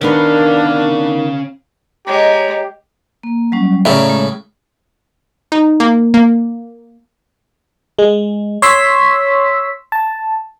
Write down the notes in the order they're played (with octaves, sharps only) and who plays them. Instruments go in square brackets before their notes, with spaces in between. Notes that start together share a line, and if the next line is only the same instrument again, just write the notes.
[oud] D#3 B3 B4 [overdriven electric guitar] C#4 F5 [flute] D4 [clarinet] A#4
[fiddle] G#3 [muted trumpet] G4 [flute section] C#5 D#5 A#5
[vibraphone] A#3
F#3 G3 C#4
[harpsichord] A2 C#3 [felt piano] C#4 E5 [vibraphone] D5 A#5
[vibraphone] G#3
[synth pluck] D#4
A#3
A#3
[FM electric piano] G#3
C#5 C6 E6 B6
A5